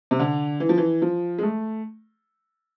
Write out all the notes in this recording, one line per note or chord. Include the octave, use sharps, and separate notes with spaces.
C3
D3
E3
F3
E3
F3
G#3
A3